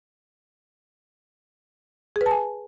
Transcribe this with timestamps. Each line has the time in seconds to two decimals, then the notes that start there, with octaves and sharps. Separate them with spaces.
2.16 G#4
2.21 B4
2.26 A5
2.31 G#5